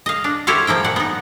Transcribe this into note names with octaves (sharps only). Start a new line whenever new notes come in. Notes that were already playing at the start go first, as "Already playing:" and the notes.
D#5 F5
D4
E4 G4 A4 C5 C#5 F5
F3 A#3 E4 G5
A#2 F#5
B3 D#4